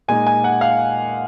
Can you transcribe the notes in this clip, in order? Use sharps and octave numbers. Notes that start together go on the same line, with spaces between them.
A#2 G#3 D#4 G#5
G#5
F#5
F5